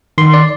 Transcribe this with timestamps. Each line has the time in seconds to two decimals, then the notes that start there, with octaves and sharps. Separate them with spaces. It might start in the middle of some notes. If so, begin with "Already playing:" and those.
0.18 D#3 C6
0.34 D5